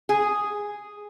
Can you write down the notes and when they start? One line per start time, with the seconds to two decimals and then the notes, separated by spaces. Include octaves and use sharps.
0.09 G#4